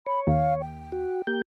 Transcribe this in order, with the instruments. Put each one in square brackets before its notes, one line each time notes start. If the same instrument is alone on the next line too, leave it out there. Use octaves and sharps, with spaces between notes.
[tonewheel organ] C#5 [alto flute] B5
[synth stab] D#2 [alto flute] F5
[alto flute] G5
[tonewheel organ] F#4
A#3 G4 G6